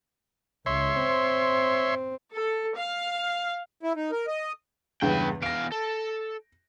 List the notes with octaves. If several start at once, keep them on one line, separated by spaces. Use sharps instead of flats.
C#2 C#5 E5 C6
C4
A4
F5
E4
D#4
A#4
D#5
E2 G2 C#3 B4 G5
E2 F5 A#6 D7
A4